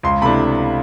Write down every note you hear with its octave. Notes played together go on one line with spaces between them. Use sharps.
C#2 C6
C3 E3 A3 D4 B5